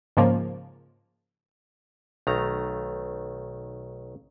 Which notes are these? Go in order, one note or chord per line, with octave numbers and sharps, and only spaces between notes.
G#2 C#3 F3 A#3
B1 D#3 A3 A#5